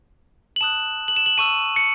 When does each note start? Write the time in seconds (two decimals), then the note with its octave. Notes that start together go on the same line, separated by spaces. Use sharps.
0.56 F#7
0.61 A5 D#6 F#6 E7
1.08 F#7
1.16 E7
1.26 F#7
1.38 A5 C#6 E6 D#7
1.76 C#7